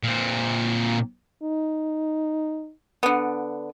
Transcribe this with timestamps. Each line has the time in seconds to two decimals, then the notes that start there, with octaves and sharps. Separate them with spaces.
0.04 A#2 C4
1.43 D#4
3.03 D3 B3